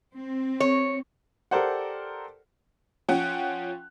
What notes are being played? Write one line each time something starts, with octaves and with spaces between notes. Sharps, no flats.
C4
C#5
G4 A4 A#4 C5 D5 F#5
F3 C#4 F#5 G5 F#6